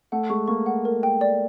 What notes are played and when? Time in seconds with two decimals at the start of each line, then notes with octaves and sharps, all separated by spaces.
0.12 A3 F#5
0.30 G#3 C#6
0.48 A#3 C#6
0.66 F#5
0.85 A#4
1.03 G5
1.21 D5